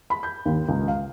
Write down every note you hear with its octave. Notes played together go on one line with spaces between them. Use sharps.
B5
G6
D#2
C#2
F5